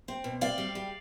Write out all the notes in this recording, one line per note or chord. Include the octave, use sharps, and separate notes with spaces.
C4
B2
C4 D5 F5
G3
G3